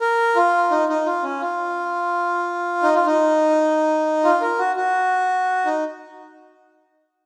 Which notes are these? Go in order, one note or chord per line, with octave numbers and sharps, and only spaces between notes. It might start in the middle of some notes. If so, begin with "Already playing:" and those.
A#4
F4
D#4
D#4
F4
C#4
F4
D#4
F4
D#4
F4
A#4
F#4
F#4
D#4